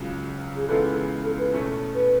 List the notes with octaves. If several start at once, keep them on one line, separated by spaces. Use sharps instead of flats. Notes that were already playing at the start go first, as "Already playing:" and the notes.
Already playing: C#2 C#3 F#3
G#4
C#2 C#3 E3 G#3 B3 A4
A4
B4
E2 B2 A3 C#4
B4